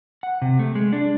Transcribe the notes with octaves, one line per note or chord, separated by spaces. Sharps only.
F#5
C3
A3
G#3
D4